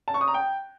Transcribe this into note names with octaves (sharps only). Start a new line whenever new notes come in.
A5
C#6
D#6
A#5
G5